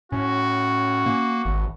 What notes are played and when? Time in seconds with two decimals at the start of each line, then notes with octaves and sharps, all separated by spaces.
0.12 A2 C#4 F#4
1.06 A#3
1.45 G#1